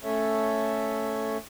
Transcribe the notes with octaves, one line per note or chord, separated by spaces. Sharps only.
A3 C#4 A4 C#5 E5